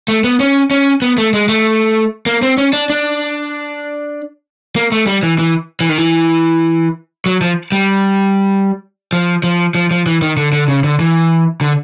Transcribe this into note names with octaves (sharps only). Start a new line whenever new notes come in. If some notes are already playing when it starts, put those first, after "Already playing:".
A3
B3
C#4
C#4
B3
A3
G#3
A3
A#3
C4
C#4
D4
D4
A#3
A3
G3
E3
E3
E3
D#3
E3
F#3
F3
G3
F3
F3
F3
F3
E3
D#3
D3
D3
C#3
D3
E3
D3